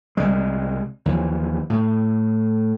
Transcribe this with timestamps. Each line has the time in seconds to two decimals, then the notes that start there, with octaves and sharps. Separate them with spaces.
0.17 C2 G3 G#3
1.06 D#2 E3 F3
1.70 A2